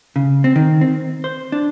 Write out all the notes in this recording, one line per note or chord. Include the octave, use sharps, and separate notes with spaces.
C#3
C4
D#3
C4
C5
D4